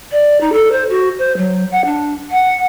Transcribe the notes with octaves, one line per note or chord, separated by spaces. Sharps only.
D5
D#4
A4
C5
F#4
C5
F#3
F#5
D4
F#5